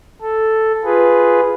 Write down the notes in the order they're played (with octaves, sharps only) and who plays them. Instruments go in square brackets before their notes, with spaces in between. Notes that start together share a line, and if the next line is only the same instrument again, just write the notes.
[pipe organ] A4
F4 G#4 B4